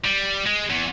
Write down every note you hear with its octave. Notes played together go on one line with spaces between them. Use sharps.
G3
G#3
E2